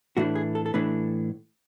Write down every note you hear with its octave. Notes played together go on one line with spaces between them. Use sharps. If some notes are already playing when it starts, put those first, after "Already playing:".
A2 E3 A3 D4 F#4
G#4
A4
A4
A2 E3 A3 D4 B4